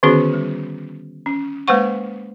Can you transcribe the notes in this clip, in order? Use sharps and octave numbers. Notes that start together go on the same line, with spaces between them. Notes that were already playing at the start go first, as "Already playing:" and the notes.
D3 D#3 B3 C#4 F#4 G#4
G3
C#4
G#3 A#3 B4 C5 F#5 C#6